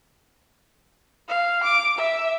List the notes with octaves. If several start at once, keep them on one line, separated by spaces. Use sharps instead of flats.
F5
D6
E5